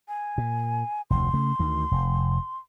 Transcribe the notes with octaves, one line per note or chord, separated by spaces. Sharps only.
G#5
A#2
F1 D2 C6
C#3 A3
D2 D#3
F1